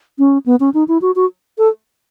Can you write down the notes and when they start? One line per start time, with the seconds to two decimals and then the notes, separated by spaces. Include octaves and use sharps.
0.18 C#4
0.46 B3
0.60 C#4
0.74 D#4
0.88 E4
1.01 F#4
1.15 F#4
1.58 A4